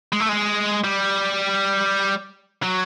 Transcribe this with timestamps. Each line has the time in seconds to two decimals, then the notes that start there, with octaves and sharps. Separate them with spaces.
0.12 G#3
0.20 A3
0.29 G#3
0.84 G3
2.63 F#3